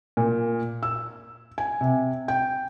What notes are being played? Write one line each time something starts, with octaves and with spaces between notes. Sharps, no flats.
A#2
E6
G#5
C3
G5